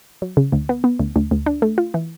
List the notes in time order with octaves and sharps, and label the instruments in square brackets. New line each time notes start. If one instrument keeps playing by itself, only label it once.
[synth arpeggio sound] F#3
C#3
D2
B3
B3
D2
D2
D2
D4
A3
F4
E3